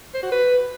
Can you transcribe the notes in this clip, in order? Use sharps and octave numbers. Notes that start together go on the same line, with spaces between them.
C5
F#4
B4